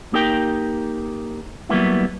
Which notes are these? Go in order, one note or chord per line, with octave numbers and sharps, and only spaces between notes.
A#3 D#4 G4 A#4 G5
F#3 G3 A#3 B3 E4